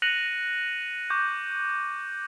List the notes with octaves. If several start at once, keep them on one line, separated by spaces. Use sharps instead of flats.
F#6 A#6 C#7 D#7 F7 F#7
C#6 D6 G6